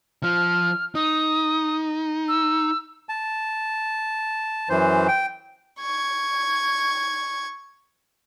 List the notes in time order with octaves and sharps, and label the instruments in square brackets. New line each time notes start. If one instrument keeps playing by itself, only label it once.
[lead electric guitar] F3 [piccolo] F6
[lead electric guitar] D#4 [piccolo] D#6
[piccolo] E6
[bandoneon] A5
F#2 E3 C5
G5
[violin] C#6 G#6